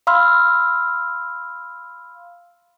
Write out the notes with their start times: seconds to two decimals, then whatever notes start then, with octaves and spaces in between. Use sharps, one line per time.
0.07 F5 B5 C6 E6 F6